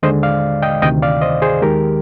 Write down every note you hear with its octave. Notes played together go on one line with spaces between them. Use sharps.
D#2 D3 G#3 C5 D#5
D5 F5
D#5 G5
D2 C3 D#3 D#5 G5
D5 F5
C5 D#5
G#4 C5
D#2 D#3 G#3 G4 A#4